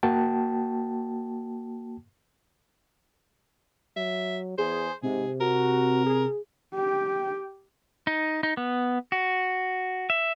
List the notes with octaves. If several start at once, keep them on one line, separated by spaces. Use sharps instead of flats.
A#3 F#4 G5 A5
F#3 E5
E2 G#4 C5
G#2 C3 G#4
F#4 A#4
G#4
G4 G5
D#4
D#4
B3
F#4
E5